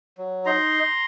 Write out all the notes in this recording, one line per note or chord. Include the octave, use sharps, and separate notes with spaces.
F#3
D#4 A#5 C6